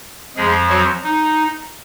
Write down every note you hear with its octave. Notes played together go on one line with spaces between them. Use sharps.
F2 F3 G#3 G#4
F#3 F#4
D#4